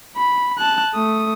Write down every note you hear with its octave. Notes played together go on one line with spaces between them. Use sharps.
B5
A5 F#6
A3 D#6